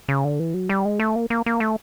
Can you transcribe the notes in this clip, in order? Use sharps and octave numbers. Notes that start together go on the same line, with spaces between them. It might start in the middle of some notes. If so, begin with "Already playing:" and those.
C#3
D3
E3
F#3
G3
G#3
A3
A#3
A#3
A#3
A3